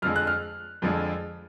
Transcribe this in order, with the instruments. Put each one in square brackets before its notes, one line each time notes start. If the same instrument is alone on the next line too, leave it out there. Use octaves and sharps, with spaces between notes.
[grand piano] F2 D3 F3 G#3 F6
F#6
F6
F2 D3 F3 G#3